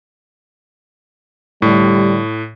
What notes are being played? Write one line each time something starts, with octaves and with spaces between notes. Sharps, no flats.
A2 D3 G3